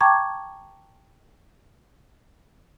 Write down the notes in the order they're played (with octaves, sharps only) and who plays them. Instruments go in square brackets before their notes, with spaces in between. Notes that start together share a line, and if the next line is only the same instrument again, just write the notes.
[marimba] G5 A5 A#5 C#6 D6 G#6